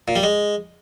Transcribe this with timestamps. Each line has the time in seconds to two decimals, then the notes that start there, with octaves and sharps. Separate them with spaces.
0.08 A#2
0.16 G3
0.23 G#3